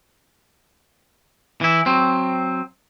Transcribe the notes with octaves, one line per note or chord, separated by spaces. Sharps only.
E3 E4
F#3 C4